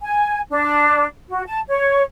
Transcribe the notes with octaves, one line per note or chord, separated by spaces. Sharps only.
G#5
D4
F#4
A5
C#5